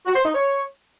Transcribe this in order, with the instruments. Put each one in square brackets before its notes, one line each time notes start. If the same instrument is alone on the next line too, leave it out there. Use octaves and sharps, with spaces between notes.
[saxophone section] F#4
C5
D#4
C#5